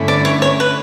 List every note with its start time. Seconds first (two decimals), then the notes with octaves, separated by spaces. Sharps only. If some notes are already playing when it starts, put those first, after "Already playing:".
Already playing: G2 D3 A3 C#4 E4
0.08 D5
0.25 C#5
0.42 C#5
0.60 B4